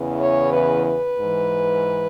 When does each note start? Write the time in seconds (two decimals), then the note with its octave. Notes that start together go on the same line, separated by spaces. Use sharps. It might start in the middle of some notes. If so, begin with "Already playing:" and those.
Already playing: E2 C#3 E3
0.21 C#5
0.53 B4
0.86 B4
1.18 G#2 E3